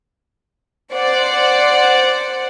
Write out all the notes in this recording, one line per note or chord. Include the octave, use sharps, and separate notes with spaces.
C5 D5 F#5